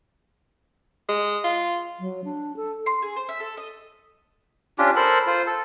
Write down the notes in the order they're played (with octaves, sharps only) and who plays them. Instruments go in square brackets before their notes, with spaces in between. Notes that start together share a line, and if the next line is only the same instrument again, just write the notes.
[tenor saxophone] G#3
F4
[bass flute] F#3
D4
A4
[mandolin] C6
G#4
C5
E5
A4
D#5
[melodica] C#4 D4 F4 G4
A4 A#4 C5 B5
F4 C5
A4